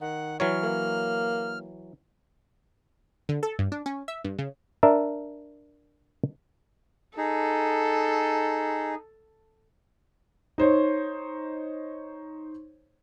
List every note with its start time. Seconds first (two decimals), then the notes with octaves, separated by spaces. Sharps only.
0.01 D#3 F#5
0.40 E3 F#3 C#5 F6
0.63 A#3
3.29 D3
3.43 A4
3.59 G2
3.72 D4
3.86 C#4
4.08 E5
4.24 G2
4.39 C#3
4.83 D4 A#4 E5
7.17 D#4 G#4 A4
10.58 D#4 C5 C#5